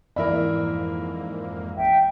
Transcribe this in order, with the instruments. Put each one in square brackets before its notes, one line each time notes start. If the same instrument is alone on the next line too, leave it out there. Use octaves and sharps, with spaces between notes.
[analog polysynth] F2 G#2 A#3 [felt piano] E3 D5 [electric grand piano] A#4 E5 B5
[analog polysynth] A1 [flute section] E5 G5